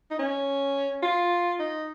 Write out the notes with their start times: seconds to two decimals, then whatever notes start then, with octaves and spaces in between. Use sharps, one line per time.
0.11 D#4
0.19 C#4
1.03 F4
1.59 D#4